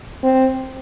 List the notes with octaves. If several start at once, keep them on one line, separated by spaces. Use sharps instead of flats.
C4